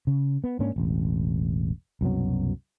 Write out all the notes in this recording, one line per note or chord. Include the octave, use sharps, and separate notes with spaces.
C#3
B3
G#2 A#3 C#4 D4
E1 A1
C2 F#2 B2 F#3